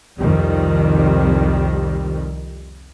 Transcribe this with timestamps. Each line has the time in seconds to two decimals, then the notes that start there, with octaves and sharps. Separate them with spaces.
0.19 C2 F2 D#3 G3